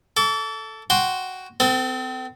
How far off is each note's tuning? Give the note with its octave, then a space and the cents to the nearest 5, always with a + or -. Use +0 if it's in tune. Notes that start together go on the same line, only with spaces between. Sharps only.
A4 +0 D6 -45
F#4 +5 G5 +0 C6 +0
C4 -35 A4 +15